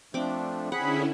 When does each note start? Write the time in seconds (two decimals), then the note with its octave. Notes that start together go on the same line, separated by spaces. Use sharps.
0.14 F3 A3 C4 D4 D6
0.72 D3 C#4 E4 G#4 F#5 B5